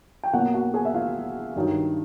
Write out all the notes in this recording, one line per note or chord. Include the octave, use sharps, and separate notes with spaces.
G5
B2 F#3 A#3 F#4 F#5
F#4 F#5
G#4 G#5
E5
F4 F5
G2 D#3 F#3